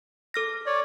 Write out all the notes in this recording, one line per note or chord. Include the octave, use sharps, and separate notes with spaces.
A4 F6 A#6
C#5 D5